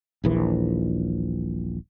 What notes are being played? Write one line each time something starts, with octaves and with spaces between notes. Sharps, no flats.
D#1 A#1 E3